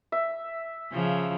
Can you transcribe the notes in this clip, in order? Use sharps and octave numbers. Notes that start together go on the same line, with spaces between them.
E5
C#3 F3